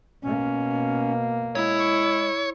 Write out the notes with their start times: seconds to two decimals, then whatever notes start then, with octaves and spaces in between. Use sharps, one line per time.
0.22 B2 A#3 C#4
1.55 G#3 E4 C#5